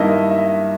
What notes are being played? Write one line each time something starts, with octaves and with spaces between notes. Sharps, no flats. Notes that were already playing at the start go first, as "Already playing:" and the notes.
Already playing: G2 D#3 A#3 E4 D#5
E5
E5